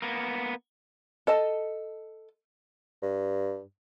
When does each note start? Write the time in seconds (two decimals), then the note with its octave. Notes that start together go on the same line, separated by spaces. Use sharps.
0.02 A#3 B3
1.27 A4 D#5 A5
3.02 G2